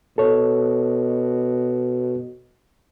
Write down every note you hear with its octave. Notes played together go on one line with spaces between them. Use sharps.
B2 A4 C#5